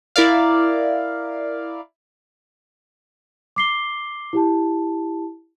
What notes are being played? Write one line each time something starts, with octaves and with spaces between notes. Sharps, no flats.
E4 A#4 D5 F5
D6 C7 G7
E4 G4 A5